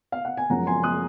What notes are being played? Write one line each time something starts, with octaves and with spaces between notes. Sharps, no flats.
F5
F#5
G#5
F#2 F3 G#3 C#4 F#5 A#5
G#5 C6
D#6 F#6